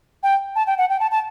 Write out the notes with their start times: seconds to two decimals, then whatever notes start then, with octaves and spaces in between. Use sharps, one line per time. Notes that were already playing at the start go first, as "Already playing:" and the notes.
0.23 G5
0.55 A5
0.67 G5
0.78 F#5
0.90 G5
1.00 A5
1.11 A5